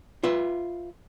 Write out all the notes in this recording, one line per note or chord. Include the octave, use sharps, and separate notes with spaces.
F4 B4 E5